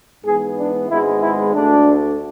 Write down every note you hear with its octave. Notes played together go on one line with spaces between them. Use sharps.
G#2 E3 B3 G#4
D4
G#1 G#2 G#3 B3 E4
E4
D2 D3 A3 D4